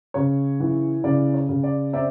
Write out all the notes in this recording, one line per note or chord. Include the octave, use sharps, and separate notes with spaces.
C#3 C#5
E3
C#3 D5
C#5
C#3
D5
C4 D5 E5